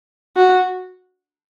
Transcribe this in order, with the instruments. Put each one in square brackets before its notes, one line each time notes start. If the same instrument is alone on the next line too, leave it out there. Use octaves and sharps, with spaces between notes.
[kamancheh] F#4